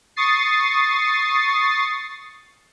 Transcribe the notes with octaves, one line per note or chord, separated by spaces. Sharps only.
C#6 D#6 A6 C7